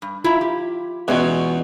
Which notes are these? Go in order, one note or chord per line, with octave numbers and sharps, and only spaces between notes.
G2
E4 F4 E5 A#5
G4
E2 B2 G#3 C#4